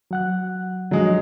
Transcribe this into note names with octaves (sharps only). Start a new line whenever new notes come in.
F#3 F#5 F#6
D3 F3 F#3 G#3